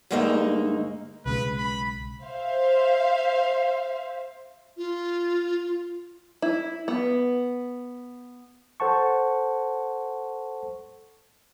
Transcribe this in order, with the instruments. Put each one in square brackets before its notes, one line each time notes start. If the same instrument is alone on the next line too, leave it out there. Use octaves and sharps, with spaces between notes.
[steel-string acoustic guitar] D2 G2 G#3 A#3 D#4 E5
[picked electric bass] B1 C#3 G#3 [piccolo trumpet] B4
[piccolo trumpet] B5
[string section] C5 E5 F5
[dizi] F4
[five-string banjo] E4
B3
[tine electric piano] A4 C5 F#5 A5 C#6